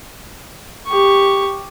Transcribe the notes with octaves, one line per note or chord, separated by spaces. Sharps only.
G4 C#6